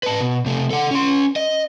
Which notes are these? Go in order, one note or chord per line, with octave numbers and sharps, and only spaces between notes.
B4 A5
B2
C3 A3
A4 F#5
C#4 C6
D#5